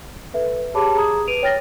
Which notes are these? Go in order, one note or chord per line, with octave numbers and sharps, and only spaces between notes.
A4 B4 E5
G4 G#4 C#5 A5 B5 D6
G#4 A#5 D#6 G#6
B4 D7 D#7 F7
C#5 G5 F6 A6 A#6